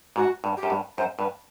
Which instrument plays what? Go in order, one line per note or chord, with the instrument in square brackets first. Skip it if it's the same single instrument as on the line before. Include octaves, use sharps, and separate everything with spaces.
[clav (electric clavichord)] G#2 [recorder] F#4
[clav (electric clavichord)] G2
[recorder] G4
[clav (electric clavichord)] F#2
G2
[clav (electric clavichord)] F#2 [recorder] C5
[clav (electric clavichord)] G2 [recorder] B4